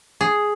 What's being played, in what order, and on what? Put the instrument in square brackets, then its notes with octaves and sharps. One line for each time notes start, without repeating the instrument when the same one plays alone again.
[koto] G#4